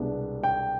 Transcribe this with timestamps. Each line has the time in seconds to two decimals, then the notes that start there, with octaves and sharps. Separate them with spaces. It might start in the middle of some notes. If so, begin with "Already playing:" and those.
Already playing: C2 B2 G#3 B3 D4
0.44 G5